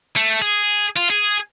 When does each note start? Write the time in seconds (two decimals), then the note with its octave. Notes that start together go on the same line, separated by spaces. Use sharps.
0.17 A3
0.42 G#4
0.97 F4
1.10 G#4